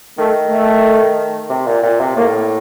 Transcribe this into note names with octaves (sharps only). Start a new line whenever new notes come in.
D#3 A3
A3
C3
A#2
A#2
C3
A2 A#3